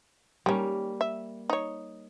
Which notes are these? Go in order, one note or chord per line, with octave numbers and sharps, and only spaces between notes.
D#3 G3 A#3 C#4
E5
D#4 C#5